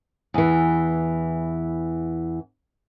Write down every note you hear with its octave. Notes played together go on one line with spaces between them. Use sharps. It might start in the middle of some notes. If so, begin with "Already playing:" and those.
E2 E3